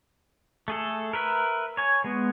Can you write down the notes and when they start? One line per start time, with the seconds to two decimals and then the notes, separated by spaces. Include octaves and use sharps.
0.68 A3 G#4 A4
1.13 A#4 B4 E5
1.77 C#5 G#5
2.04 G#3 B3